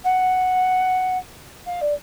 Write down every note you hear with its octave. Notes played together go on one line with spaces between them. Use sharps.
F#5
F5
D5